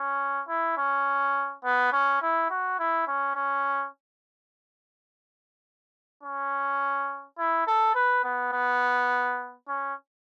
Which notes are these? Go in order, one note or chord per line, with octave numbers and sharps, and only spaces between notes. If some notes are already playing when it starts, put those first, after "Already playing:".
Already playing: C#4
E4
C#4
B3
C#4
E4
F#4
E4
C#4
C#4
C#4
E4
A4
B4
B3
B3
C#4